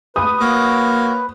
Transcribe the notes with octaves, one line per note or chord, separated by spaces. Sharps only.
G4 B4 D#6
A#3 F#4 C#5